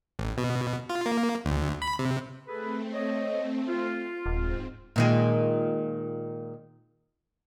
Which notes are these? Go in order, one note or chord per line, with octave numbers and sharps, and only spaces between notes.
A1
B2
F4
A#3
D2
B5
C3
A3 C4 G#4 A4 B4
C#5 D#5
F4
D#1 G#2 C4
A#2 D#3 G#3